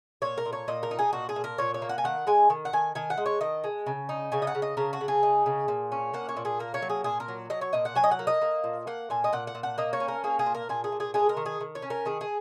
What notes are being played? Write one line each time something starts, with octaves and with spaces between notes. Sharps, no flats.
A#2 C#5
A#4
A#2
C#5
A#2 D#5
A#4
D#4
G#4
A#2 F#4
G#4
A#2
A#4
A#2 C#5
C#5
A#3
F#5
G#5
D#3 F#5
G#3 G#5
D#3
F#5
D#3 G#5
D#3 G#5
F#5
G#3
C#5
D#3 D#5
G#3
C#3
D#4
C#3 G#5
D#5
F#5
C#3
D#5
C#3 A#4
F#4
C#3
G#4
D#4
C#3
A#2
C#4
A#3 F#5
C#5
A#2
G#4
A#3 A#4
C#5
F#3
G#4
A#2 G#4
A#4
F#3
F#3 D#5
C#5
A#2 D#5
F#5
F#3 G#5
D#5
F#5
A#3
D#5
A#3
A#2
A#3 F#5
A#2 G#5
D#5
A#2 F#5
F#5
A#2
F#5
A#3 D#5
C#5
C#4
A#4
A#3 G#4
G#4
A#2
A#4
A#2 G#4
G#4
A#2
G#4
G#3 G#4
A#4
D#3
G#4
D#3
C#5
C#4
A#4
D#3 G#4
G#4